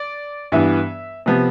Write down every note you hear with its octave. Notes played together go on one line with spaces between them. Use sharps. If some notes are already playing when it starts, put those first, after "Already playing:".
Already playing: D5
G2 E3 B3 E5
C3 F3 B3